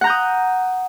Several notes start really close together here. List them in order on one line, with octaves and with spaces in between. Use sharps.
F#5 A#5 G6 D#6